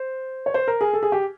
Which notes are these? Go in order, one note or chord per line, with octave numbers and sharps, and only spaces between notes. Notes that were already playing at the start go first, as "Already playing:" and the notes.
Already playing: C5
C#5
C5
A#4
G#4
A4
G#4
G4